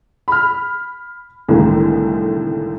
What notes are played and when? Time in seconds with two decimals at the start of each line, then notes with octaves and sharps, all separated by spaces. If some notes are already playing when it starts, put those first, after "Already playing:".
0.28 B5 F6
1.48 C2 A2 D3 D#3 G#3 A#3